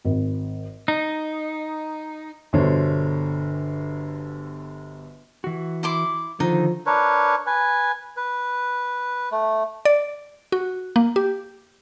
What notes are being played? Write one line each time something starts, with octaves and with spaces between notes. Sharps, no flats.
G#1
D#4
G1 B2 D3 C5 C#5
E3 F#4
E4 C6 D6
D3 D#3 F3 D#4
D4 A#4 B4 C#5
B4 G#5
B4
A3
D5
F#4
A#3
G4